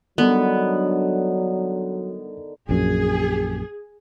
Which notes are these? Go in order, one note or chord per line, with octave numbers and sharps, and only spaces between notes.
D3 D#3 F#3 G3 B3 D4 A4
A#1 F#2 G#4